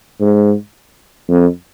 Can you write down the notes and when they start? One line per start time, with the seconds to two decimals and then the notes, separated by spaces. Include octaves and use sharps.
0.21 G#2
1.29 F2